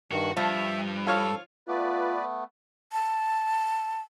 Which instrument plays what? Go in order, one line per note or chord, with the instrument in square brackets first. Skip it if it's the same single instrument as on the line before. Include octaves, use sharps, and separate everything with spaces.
[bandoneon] G2 D#3 [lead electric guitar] F#4
[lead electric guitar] G2 [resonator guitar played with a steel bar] F3 [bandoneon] E5
[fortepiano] F4 C#5 F5 [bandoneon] A4
[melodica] A3 B3 [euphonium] F4 [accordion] B4 D5
[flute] A5